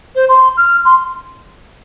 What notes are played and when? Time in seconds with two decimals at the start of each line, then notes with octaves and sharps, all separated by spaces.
0.15 C5
0.29 C6
0.57 F6
0.85 C6